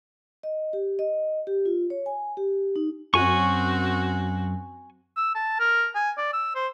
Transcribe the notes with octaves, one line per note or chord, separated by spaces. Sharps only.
D#5
G4
D#5
G4
F4
C#5
G#5
G4
D#4
F#2 C4 F#4 G#5 C#6
E6
A5
A#4
G#5
D5
E6
C5